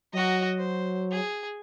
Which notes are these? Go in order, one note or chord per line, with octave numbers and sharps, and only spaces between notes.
F#3 F#4 D#5
C5
G#4